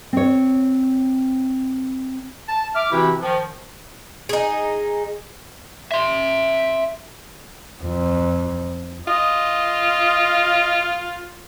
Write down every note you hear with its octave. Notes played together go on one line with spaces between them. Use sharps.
C4 C#5
A5
E5 D6 F6
C3 E3 C4 E4 F#4 G4
D#3 F3
D#4 G#4
E5 C6
F2
F4 D#5